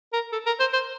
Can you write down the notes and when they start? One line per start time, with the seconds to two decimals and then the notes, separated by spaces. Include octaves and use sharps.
0.13 A#4
0.32 A4
0.46 A#4
0.60 C5
0.73 C5